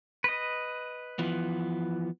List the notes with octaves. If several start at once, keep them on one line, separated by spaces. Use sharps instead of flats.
B4 D#5
E3 F3 B3